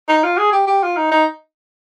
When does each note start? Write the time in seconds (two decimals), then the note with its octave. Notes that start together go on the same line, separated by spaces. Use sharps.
0.09 D#4
0.24 F4
0.38 G#4
0.53 G4
0.67 G4
0.83 F4
0.97 D#4
1.12 D#4